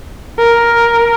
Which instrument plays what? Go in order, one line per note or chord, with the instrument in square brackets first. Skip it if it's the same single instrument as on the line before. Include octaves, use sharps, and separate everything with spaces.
[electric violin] A#4